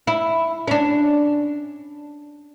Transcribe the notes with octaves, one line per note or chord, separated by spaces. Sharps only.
E4
C#4 D4